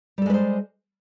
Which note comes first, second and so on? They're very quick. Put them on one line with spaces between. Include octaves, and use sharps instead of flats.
G3 A4 G#3 B4 C5